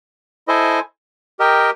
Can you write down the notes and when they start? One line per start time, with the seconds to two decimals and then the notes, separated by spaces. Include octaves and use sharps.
0.48 E4 A4 C5 D#5 G#5
1.39 G4 A#4 D#5 G5